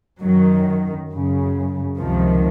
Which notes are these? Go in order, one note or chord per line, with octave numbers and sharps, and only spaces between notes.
F#2 D#3 F#3
F#2 C#3
C#2 C3 D#3 F3